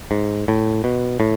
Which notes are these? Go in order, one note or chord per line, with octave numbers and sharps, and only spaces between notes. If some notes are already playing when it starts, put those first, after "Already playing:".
G#2
A2
B2
A2